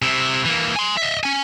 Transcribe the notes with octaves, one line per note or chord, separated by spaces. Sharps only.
C3 E4
E3 A#3
G#5 C6
D#5 E5
C#4 G#5